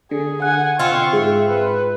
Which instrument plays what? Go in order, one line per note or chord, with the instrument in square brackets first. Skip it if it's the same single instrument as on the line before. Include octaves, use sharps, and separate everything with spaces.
[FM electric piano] D3 [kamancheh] G#4
[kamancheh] F#5 G#5 [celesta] F#6
[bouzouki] C4 F4 [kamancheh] C#6
[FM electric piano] G#2 [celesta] G#4 [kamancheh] E5
[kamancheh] B4